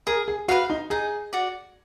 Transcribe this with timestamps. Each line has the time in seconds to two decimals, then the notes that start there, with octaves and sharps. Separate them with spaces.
0.07 G#4 A#4
0.28 G#4
0.48 F#4 B4 D5 F5
0.70 D#4
0.90 D#4 G#4
1.33 F#4 D5